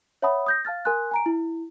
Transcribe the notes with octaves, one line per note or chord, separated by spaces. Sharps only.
C#5 E5 F#5 A5 B5 D#6
D#6 G6 A#6
F5 A5 F6 A6
A#4 G#5 C6 F#6
G#5 A#5 D7
E4